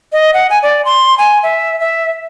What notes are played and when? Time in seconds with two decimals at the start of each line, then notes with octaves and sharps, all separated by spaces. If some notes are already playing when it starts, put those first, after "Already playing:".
0.12 D#5
0.34 F#5
0.50 G#5
0.63 D5
0.85 C6
1.18 G#5
1.43 E5
1.80 E5